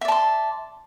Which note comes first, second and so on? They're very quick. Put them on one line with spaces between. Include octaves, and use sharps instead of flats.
E5 D5 A5 C6